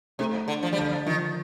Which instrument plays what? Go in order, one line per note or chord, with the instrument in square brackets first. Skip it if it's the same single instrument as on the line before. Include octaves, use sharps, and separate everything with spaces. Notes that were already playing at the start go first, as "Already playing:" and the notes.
[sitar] C3 [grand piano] A3
[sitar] D3 [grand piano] D4
[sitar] F3
G3
[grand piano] D3 [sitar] F3
[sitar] D#3 [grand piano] F3